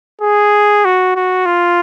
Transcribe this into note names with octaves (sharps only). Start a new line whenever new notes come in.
G#4
F#4
F#4
F4